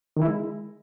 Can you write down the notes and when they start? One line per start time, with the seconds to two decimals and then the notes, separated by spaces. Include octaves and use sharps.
0.17 D#3
0.22 E4
0.27 G#3